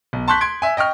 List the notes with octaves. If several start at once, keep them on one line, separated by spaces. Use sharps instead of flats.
B1
A5 C6 C#6 F#6 G6 B6
C6 G#6 D7
E5 G#5
D#5 G5 C#6 F6